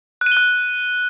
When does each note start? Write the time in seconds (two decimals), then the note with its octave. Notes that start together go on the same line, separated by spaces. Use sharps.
0.21 F#6
0.26 D#7
0.32 G7
0.37 F#6